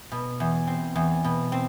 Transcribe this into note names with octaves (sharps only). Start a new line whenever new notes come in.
B2
E2
C4
E2
B2
C4